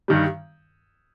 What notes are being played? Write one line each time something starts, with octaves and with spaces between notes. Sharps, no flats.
G2 D#3 G3